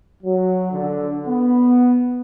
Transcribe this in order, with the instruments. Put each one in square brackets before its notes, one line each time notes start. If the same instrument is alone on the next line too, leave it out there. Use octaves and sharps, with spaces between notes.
[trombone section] F#3
D3
B3